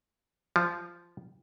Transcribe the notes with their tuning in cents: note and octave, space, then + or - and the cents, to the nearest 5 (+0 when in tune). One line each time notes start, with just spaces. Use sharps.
F3 -10